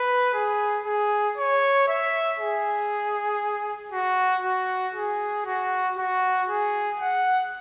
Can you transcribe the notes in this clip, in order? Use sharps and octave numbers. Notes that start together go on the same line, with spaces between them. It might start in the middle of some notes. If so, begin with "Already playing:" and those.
Already playing: B4
G#4
G#4
C#5
E5
G#4
F#4
F#4
G#4
F#4
F#4
G#4
F#5